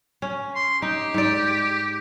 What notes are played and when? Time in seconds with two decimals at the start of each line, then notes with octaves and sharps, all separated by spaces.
0.22 C#4
0.56 C6
0.82 D#4 G4
1.14 G#2 D5